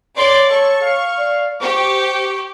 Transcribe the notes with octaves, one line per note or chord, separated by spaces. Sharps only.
C#5 D5 C6
A4 C#6
F5
D5
G4 C5 C#6